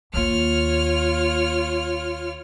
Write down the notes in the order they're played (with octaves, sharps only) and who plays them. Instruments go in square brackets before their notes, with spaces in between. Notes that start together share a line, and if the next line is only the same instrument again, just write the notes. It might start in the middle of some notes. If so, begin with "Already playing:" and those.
[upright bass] D#2 A#3 [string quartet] F4 C#5 F6